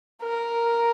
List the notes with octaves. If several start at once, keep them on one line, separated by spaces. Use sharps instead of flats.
A#4